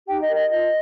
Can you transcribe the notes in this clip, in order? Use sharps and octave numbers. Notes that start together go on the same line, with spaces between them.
D#4 G4 G5
D#5
A#4
D#5
F4 D#5